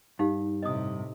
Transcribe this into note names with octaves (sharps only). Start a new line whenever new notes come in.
G2 D#4 G4 F5
A2 C3 D#5 D#6